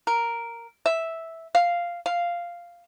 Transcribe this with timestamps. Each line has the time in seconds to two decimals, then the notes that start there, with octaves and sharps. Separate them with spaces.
0.07 A#4
0.86 E5
1.55 F5
2.06 F5